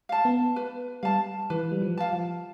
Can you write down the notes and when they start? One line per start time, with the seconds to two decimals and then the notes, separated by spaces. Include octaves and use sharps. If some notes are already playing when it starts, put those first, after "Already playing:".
0.09 F5 A5
0.25 B3
0.56 B4
1.03 G3 F5 A5
1.50 E3 B4
1.71 G3
1.82 F3
1.98 F5 A5
2.13 F3